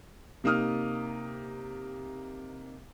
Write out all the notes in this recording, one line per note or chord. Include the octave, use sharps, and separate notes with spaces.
C3 A#3 D#4 D#6 F6